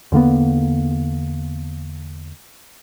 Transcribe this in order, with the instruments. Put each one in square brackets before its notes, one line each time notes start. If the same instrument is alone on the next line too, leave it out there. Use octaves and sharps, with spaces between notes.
[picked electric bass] E2 D3 A#3 B3